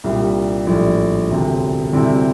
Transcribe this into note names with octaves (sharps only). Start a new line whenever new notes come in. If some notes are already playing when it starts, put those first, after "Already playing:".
C2 A#2 G3 D4
A#1 A2 G3 D4
E1 D2 C3
D2 C3 G3 C4 E4